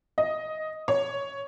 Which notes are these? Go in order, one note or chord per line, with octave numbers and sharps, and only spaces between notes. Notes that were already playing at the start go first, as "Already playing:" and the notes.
D#5
C#5